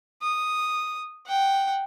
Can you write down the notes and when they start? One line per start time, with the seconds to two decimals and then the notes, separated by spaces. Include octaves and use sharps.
0.22 D#6
1.27 F#5 G5